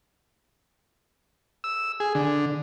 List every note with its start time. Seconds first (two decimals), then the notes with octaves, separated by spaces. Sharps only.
1.64 E6
2.00 G#4
2.15 D3